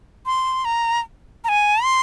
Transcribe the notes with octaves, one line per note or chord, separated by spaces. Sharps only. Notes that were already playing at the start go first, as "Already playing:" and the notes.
C6
A#5
A#5
G#5
C6